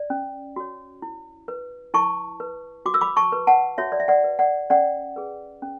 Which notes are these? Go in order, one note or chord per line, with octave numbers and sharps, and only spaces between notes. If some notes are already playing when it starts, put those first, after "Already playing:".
Already playing: D5
C#4
F#4 C#5
E4
B4
E4 A5 C#6
B4
F#4 D6
E6
B5 D6
A5 C#6
B4
F#5 A5
F#4 C#5 E5
D5
E5
D5 F#5
B4
D5 F#5
C#4 D5 F#5
G#4 B4
C#4